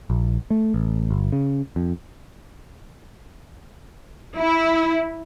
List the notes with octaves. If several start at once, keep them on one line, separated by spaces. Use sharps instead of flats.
A#1
A3
A1
G1
C#3
F2
E4